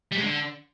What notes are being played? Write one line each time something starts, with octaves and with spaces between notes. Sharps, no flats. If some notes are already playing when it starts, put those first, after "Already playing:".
G3
G#3
D3